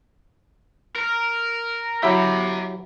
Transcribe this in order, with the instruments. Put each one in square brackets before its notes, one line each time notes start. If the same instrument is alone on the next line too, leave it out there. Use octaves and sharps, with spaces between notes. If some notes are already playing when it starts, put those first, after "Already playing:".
[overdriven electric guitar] A#4
[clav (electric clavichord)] F#3 E4 E5 [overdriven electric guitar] G4 A#5